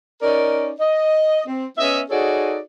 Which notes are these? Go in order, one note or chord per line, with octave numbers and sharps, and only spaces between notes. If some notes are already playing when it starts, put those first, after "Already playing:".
C#4 D#4 A#4 D5
D#5
C4
B3 C#4 D#5 E5
D#4 F#4 G#4 A4 C#5 D5